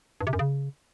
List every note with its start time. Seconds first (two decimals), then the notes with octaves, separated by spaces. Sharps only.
0.21 G2
0.27 C3
0.33 F#2
0.39 C#3